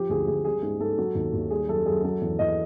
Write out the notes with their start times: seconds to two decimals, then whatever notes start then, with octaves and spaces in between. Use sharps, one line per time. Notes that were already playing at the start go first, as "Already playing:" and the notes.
Already playing: F3 G4
0.09 D2 G#4
0.27 D2 G#4
0.45 G3 G#4
0.62 G#2 G#4
0.80 G#2 A4
0.98 F#3
1.15 D#2
1.34 D#2
1.50 G3 G#4
1.68 F#2 A4
1.86 F#2 G#4
2.03 F#3 A4
2.22 E2
2.39 E2 D#5